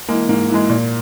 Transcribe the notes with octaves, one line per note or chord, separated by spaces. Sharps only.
E3 G#3 A#3
G#2 A#3
E3 G#3
A#2